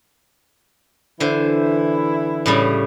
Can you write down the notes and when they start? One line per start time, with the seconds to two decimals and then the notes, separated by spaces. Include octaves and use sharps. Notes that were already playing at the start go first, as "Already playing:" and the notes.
1.20 D3 E3 E4 C5
2.46 A2 C#3 G3